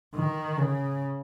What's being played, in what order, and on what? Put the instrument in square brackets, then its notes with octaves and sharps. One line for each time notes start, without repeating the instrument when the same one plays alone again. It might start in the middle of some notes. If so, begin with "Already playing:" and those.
[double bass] D#3
C#3